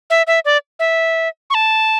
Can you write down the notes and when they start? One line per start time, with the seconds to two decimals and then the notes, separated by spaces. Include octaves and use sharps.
0.10 E5
0.27 E5
0.45 D5
0.79 E5
1.50 C#6
1.54 A5